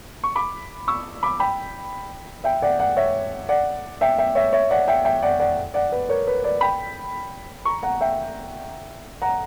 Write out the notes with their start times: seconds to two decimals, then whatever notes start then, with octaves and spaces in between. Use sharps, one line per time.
0.24 C#6
0.36 B5 D6
0.88 C#6 E6
1.23 B5 D6
1.40 G5 B5
2.44 E5 G5
2.62 D5 F#5
2.79 D5 F#5
2.97 C#5 E5
3.49 D5 F#5
4.01 E5 G5
4.18 E5 G5
4.35 C#5 E5
4.52 C#5 E5
4.70 D5 F#5
4.88 E5 G5
5.05 E5 G5
5.22 D5 F#5
5.39 D5 F#5
5.74 D5 F#5
5.92 B4
6.09 A#4 C#5
6.27 B4
6.44 B4 D5
6.61 G5 B5
7.65 A#5 C#6
7.83 F#5 A#5
8.01 E5 G5
9.22 F#5 A#5